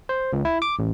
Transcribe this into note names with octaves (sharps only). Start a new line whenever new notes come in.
C5
C#2
E4
D6
A1